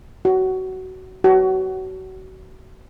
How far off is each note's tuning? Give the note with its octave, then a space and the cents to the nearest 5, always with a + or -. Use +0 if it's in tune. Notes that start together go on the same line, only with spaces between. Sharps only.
F#4 +20
F#4 +30